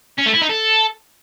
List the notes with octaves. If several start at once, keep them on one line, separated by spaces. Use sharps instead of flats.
C#4
A3
E4
D#4
A4